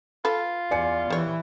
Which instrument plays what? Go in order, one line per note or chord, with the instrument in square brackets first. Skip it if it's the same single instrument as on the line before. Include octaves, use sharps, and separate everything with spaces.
[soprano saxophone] F4 [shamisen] A4 B4
[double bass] E2 [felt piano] D5 G#5 C#7
[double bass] E3 [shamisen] G3 C#5